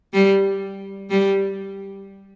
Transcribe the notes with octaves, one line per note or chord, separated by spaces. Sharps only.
G3
G3